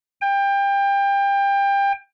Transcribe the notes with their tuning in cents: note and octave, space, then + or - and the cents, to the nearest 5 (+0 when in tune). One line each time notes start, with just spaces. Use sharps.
G5 +25